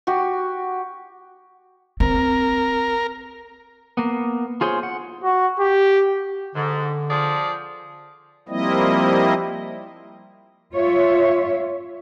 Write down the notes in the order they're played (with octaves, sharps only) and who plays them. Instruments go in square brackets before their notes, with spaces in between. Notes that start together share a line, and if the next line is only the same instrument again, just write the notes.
[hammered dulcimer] F#4 G4
[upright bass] C4 [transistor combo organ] A#4
[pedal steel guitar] A#3 B3
F4 G#4 C5 C#5 C6
F#5
[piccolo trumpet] F#4
G4
[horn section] G#2 [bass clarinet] D3
[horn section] F3 G#4 D5
[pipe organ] F3 G3 A#3 C4 E4 D#5
[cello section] F4 C#5 E5